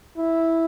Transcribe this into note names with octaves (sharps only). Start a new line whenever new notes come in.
E4